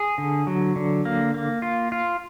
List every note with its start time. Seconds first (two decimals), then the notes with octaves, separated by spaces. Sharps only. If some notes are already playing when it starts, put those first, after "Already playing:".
Already playing: G#4
0.18 D3
0.47 F#3
0.76 D3
1.05 A#3
1.34 A#3
1.62 F4
1.92 F4